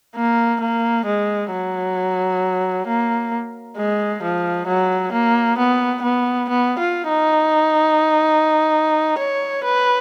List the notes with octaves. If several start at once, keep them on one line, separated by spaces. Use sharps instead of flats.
A#3
A#3
G#3
F#3
A#3
G#3
F3
F#3
A#3
B3
B3
B3
F4
D#4
C#5
B4